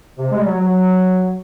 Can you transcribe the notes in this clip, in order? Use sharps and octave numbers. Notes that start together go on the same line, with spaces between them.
C3
G#3
G3
F#3
F#3